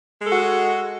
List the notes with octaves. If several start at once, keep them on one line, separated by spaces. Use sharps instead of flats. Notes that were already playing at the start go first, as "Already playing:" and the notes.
G#3 F#4 A4